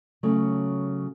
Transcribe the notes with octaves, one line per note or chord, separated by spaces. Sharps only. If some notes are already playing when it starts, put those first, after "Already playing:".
C#3 F#3 A3